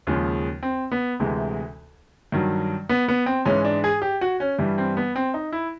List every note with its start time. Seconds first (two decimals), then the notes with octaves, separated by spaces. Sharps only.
0.07 D#2 C#3 F3 G#3
0.63 C4
0.92 B3
1.20 D2 C3 E3 G#3
2.32 G2 D#3 F#3
2.89 B3
3.08 B3
3.26 C4
3.45 G#2 E3 G#3 C#4
3.65 D4
3.84 G#4
4.02 G4
4.21 F#4
4.40 C#4
4.59 G2 E3 G3
4.78 C4
4.97 B3
5.16 C4
5.34 D#4
5.52 E4